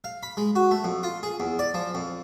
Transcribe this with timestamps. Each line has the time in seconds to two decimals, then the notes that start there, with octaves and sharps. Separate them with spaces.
0.04 F5
0.23 B5
0.37 G#3
0.55 F#4
0.71 A3
0.84 F2
1.03 F4
1.23 G#4
1.40 E2
1.59 D5
1.74 F3
1.95 F2